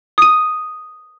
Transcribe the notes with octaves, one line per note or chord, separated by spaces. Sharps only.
D#6 D#7